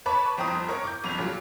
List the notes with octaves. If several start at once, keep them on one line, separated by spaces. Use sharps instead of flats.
B4 C#5 A5 B5 C#6 D6
G1 F2 C5 G5 A#5 D#6
A#4 C#5
D6 G6
G1 F2 F7
A#2 C#3 F#3